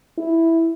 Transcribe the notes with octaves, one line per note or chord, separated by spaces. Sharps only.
E4